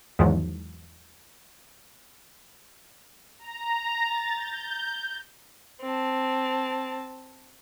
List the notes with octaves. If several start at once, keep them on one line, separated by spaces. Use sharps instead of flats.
E2 G#2 D#3 F3 F#3
A#5
A6
G6
C4 A5